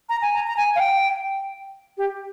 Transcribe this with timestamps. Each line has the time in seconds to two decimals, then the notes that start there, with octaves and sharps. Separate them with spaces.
0.09 A#5
0.22 G#5
0.33 A#5
0.47 A#5
0.57 G#5
0.75 F5
0.80 G5
1.97 G4